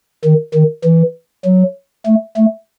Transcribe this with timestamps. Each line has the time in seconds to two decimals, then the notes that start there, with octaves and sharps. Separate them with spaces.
0.25 D#3
0.55 D#3
0.84 E3
1.45 F#3
2.06 A3
2.37 A3